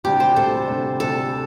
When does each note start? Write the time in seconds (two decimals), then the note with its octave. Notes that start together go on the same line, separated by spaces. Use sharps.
0.04 D2 C3 G3 D4 G4
0.20 C5
0.36 D2 C3 G3 D4 A4
0.68 D2 C3 G3 D4
1.00 D2 C3 G3 D4 A4